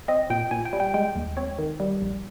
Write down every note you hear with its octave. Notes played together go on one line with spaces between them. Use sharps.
C4 D#5
A#2 G5
A#2 G#5
G5
G3
G5
G#3 G5
D#2
C4 C#5
D#3
G3
A#1